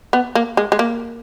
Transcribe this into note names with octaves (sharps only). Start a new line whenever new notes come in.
B3
A#3
G#3
G#3
A#3